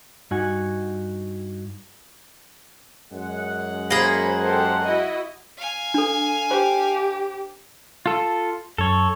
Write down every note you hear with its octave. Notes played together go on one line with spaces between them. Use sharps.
G2 D#4 F#4 F#5 G#5
F#2 G#3 F#5
A#3 G#4 C5 B5
G4 A4 C5
E4 F#4 D#5
F5 G#5
D4 A4
G4 C5
F4 A4
F#2 A4 C#5